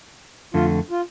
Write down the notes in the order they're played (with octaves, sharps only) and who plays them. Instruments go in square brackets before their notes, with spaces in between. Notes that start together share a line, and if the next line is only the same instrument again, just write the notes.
[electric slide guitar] F2 D3 A3 [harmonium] F4
[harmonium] F4